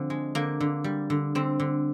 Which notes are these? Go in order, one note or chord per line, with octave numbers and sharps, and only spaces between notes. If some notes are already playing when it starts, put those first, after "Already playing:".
Already playing: D3 F3 C4
G#3
D3 A#3
D3
G3
D3
D3 C4
D3